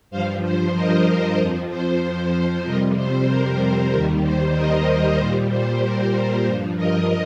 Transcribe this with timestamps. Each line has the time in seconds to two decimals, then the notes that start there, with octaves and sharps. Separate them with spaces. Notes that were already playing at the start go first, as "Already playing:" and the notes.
0.11 G2 F3 C5 F5
0.43 C5
0.75 A#4 D#5
1.06 A#4 D#5
1.37 F2 F3
1.70 C5
2.02 C5
2.65 F2 C3 G3 A#4 D#5
2.96 C5
3.28 A#4
3.92 D#2 D#3 G3 A#4
4.23 C5
4.55 A#4 D#5
5.18 A#2 G3 C5
5.50 C5
5.83 A#4
6.14 C5
6.46 G2 F3
6.77 A#4 D#5